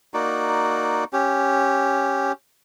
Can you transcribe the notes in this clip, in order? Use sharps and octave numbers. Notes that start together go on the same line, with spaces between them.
A#3 D#4 F#4 D5
C#4 G4